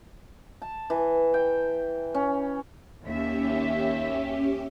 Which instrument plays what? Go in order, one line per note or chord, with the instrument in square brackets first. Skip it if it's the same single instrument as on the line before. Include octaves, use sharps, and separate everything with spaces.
[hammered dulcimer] A5
E3
G5
C#4
[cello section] D#2 E5 [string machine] C#4 G4